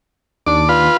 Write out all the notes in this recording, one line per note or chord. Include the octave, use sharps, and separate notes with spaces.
D#2 D4 D5
F4 B4